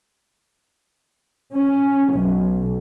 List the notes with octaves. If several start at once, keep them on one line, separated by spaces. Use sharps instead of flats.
C#4
B1